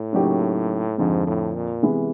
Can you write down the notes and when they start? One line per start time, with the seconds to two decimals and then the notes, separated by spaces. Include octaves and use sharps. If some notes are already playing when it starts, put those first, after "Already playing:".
Already playing: A2
0.13 C#3 F#3 A#3 D#4 G4
0.98 F2 G#2 D3 F3
1.27 A2
1.55 A#2
1.83 C3 E3 G#3 B3